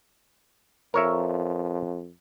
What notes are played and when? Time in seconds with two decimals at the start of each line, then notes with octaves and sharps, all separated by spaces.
0.94 F2 A#4 C#5 E5